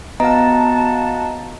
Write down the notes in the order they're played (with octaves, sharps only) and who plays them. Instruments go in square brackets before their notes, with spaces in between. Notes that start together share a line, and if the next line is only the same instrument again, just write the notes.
[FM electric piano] B3 F5 [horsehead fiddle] F#4 A5 [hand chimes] D#5 A#5